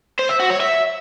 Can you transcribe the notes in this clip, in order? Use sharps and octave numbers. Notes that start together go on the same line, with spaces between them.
C5
E5
F#4
C#5
E5